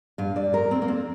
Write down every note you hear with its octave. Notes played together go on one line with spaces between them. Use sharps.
G2 F5
G2 D5
F2 A#4
F2 C4
A#3
F2 C4